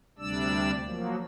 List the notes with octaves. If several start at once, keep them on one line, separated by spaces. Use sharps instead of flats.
D2 C3 G3 D4 D5 E6
F3 F#3 A#3